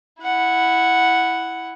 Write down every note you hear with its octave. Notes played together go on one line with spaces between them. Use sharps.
E4 F#5